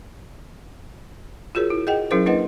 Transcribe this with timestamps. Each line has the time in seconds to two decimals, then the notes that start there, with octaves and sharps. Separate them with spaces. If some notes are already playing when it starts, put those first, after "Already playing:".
1.55 F4 F#4 G#4 A#4 C#5
1.70 E4
1.87 G#4 D#5 F#5 G5
2.11 F#3 C#4 E4 G#4 A#4 C5
2.26 A#3 D4 E4 B4 D#5 F#5